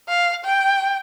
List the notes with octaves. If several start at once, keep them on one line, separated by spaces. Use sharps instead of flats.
F5
G5